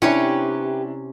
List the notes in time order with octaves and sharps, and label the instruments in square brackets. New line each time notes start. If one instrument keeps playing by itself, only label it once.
[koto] C3 C#4 [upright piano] D4 E4 [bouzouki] G4 B4 C#5